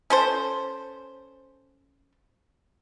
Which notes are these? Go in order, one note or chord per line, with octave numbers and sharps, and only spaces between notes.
C#4 A4 C5